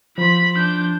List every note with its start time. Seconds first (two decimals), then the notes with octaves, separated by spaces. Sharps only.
0.18 F3 B5 C6
0.57 D4 G6